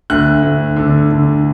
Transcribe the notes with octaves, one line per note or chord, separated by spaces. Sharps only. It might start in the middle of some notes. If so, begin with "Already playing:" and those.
D2 F#6
D2
D3
D3